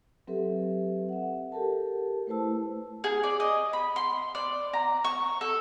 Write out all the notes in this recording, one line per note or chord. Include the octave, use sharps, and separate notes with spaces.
F#3 C4 G4 A4 B4 E5
E5 F#5
G4 A4 A#4 A5
A3 E4 B4 C5 A5 E6
G#4
D5
D#5
B5
C6
D5
A#5
C#6
A4